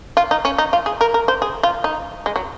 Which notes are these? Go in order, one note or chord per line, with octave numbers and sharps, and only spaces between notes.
F4
D#4
C#4
D#4
F4
G#4
A#4
A#4
C5
G#4
F4
D#4
G#3
F#3